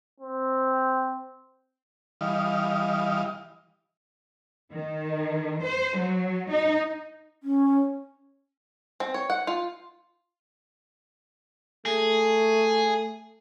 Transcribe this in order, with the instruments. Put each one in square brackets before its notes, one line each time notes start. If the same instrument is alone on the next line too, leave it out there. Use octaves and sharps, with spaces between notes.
[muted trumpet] C4
[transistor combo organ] E3 G3 D#5 F5
[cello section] D#3
C5
F#3
D#4
[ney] C#4
[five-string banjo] C4
C#5
F#5
F4
[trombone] A3 [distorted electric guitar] G#4